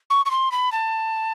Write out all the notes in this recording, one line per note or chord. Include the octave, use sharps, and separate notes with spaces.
C#6
C#6
C6
B5
A5